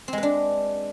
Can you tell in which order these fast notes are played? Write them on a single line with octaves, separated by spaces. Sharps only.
C4 G#3 B4 D4